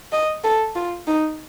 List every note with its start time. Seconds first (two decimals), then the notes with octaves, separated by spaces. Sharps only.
0.12 D#5
0.44 A4
0.75 F4
1.07 D#4